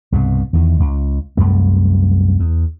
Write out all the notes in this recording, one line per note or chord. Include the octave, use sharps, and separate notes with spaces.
C2 G2 B2
E2 D#3
C#2
C2 F#2 A3
E2